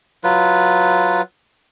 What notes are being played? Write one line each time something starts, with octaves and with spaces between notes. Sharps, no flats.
F#3 F4 B4